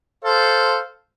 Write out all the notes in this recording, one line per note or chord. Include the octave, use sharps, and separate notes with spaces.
A4 C5 F5